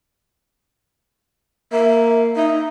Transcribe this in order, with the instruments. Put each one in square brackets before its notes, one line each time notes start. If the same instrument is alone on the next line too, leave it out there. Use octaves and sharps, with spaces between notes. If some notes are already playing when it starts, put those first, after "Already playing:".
[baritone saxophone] A#3 [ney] E5
[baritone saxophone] D#4 [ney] E5